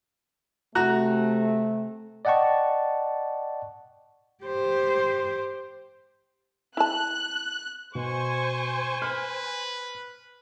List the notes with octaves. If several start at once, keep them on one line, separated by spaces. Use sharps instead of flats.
C3 A3 F#4 A#5 F#6
D5 D#5 F#5 G5 A5 C#6
G4 C5
E4 A5 F#6
B2 C5 G#5 C#6
B4 F6